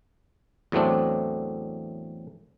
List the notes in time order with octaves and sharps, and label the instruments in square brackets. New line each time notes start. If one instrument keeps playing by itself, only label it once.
[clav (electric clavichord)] E2 A2 F#3 A3 C4 D4